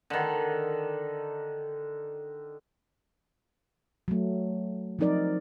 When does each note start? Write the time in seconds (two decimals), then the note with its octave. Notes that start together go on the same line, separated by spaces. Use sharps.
0.10 D3 D#3
4.08 F#3 A3
4.99 F3 F#3 C4 D#4 A#4 D5